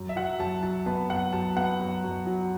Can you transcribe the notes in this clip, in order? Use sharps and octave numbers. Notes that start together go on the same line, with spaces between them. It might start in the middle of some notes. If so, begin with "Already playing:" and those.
Already playing: F#2
E5
F#3 F#5
F#2 A5
F#3 A5
B3 A5
F#2 F#5
F#2 A5
B3 F#5
F#2
F#2
F#3